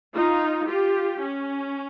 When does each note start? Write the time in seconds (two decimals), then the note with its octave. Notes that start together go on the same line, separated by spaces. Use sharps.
0.14 D#4 F4
0.67 F4 G4
1.20 C#4